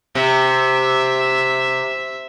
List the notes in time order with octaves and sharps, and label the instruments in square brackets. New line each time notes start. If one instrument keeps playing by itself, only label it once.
[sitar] C3 [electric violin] E5